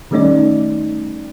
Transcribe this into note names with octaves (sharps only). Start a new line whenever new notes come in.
D#3 G3 A3 C#4 D#4 D5